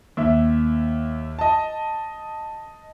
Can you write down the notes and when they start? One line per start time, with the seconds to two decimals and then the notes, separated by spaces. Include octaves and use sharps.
0.17 D#2 E5
1.39 D#5 A5